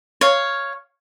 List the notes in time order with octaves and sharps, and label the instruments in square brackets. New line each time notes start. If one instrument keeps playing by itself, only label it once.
[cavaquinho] C#5 F5